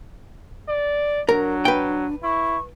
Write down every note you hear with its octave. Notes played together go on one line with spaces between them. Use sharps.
D5
F#3 D4 A#4
B4 G5
E4 C#6